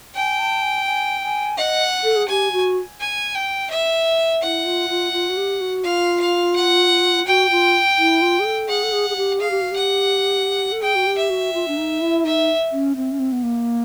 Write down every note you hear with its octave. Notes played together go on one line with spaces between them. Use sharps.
G5 G#5
A5
G#5
G#5
G#5
D#5 F#5
A4
G#4
G4 G#5
F#4
G#5
G5
E5
E4 F#5
F4
F4
F4
F#4
G4
F#4
F4 F5
F5
F#5
F#4 G5
F4
E4
F4
G#4
A4
G#4 F#5
A4
G#4
G#4
G4
G#4 F5
G4
F#4
G4 F#5
A4
G#4 G5
F#4
G4
E5
F#4
F4
D4
D#4
E4
D#4 E5
C#4
C4
C#4
C4
B3
A#3